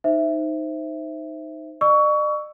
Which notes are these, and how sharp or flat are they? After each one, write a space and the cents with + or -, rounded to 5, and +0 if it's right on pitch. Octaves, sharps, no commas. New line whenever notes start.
D#4 +0 C5 +0 E5 +0
D5 +45 C#6 +25 E6 +0